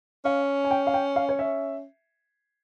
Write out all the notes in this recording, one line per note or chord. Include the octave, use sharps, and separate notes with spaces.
C#4 F5
G#5
G5
F5
G5
F5
C#5
E5